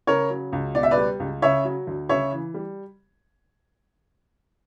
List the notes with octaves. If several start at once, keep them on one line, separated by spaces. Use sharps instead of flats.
C#3 A#4 C#5
F#3
C#2
B2 D5
E5
B4 D5
G3
C#2
C#3 C#5 E5
F#3
D2
C#3 C#5 E5
E3
G3